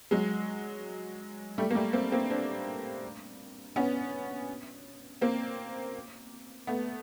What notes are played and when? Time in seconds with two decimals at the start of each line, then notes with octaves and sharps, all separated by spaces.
0.11 F#3 G#3
1.58 G3 A3
1.71 A#3
1.75 G3 A3
1.93 A#3 C4
2.12 A#3 C4
2.30 C4 D4
3.76 B3 C#4
5.21 A#3 C4
6.67 A3 B3